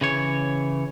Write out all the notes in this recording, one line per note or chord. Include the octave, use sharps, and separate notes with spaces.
C#3 E3 C#5